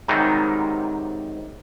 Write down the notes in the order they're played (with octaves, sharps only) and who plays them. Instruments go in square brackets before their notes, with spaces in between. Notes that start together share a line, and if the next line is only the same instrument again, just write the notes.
[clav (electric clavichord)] G#2 C3 D#3 F#3 G3 D#4